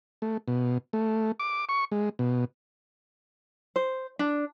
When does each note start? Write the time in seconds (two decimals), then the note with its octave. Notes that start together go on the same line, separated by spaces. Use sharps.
0.22 A3
0.48 B2
0.93 A3
1.39 D6
1.69 C#6
1.92 G#3
2.19 B2
3.76 C5
4.19 D4